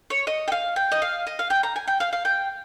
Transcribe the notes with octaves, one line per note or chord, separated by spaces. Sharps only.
C#5
D#5
G5
F5
G5
D#5
F5
D#5
F5
G5
A#5
G#5
G5
F5
F5
G5